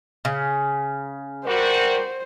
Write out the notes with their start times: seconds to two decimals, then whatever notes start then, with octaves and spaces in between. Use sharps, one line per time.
0.25 C#3
1.46 G3 F#4 A#4 C5